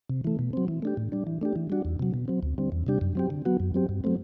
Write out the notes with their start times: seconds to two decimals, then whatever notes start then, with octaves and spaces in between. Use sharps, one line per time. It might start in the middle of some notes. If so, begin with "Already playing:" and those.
0.10 C3
0.24 E3 A3
0.39 B2
0.53 F#3 C4
0.68 E3
0.82 A3 D4 G4
0.97 A2
1.12 G3 D4
1.27 E3
1.41 A3 D4 G4
1.56 E3
1.70 G3 D4 F#4
1.85 E2
2.00 C3 F#3
2.14 B2
2.28 F#3 C4
2.43 D2
2.58 D3 G3 C4
2.72 E2
2.87 C3 G3 D4 G4
3.01 F#2
3.15 F#3 C4 G4
3.30 D3
3.45 F#3 B3 F#4
3.60 F#2
3.74 F#3 C4 G4
3.89 G2
4.04 F#3 A3 C4